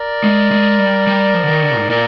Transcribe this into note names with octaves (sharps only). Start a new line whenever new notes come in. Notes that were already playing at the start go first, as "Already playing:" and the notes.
Already playing: A#4 D5
G#3
G#3
G3
G3
F3
D3
D#3
D3
G#2
A#2 A#4 D5